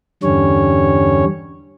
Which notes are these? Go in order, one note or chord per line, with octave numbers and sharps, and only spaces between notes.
E2 G2 D3 G3 C#4 C#5